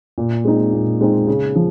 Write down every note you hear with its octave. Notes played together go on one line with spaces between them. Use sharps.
A#2
G#3 C4 D#4
A#2
G#3 C4 D#4
C#3
F3